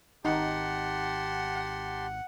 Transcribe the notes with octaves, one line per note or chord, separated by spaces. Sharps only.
G#1 D#4 G4 F#5 A5 C6